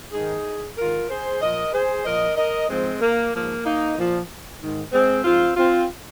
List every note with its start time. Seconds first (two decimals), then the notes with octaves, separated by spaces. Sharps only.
0.13 G#2 D#3 D#4 G#4
0.77 G#2 D#3 F4 A#4
1.08 G#4 C5
1.42 A#2 F3 A#4 D#5
1.73 G#4 C5
2.05 A#2 F3 A#4 D#5
2.36 A#4 D#5
2.69 G#2 F3 G#3 C4
3.01 A#3
3.33 G#2 F3 A#3
3.65 A#3 D#4
3.97 A#2 F3
4.60 G#2 D#3
4.92 G#3 C4
5.24 G#2 F3 C4 F4
5.57 C4 F4